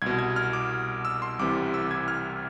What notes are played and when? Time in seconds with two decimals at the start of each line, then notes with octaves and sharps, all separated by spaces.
0.02 C2 B2 G#6
0.19 G#6
0.36 F6
0.53 D6
1.05 E6
1.22 C6
1.39 C2 C3 E3 D6
1.74 E6
1.91 G#6
2.08 F6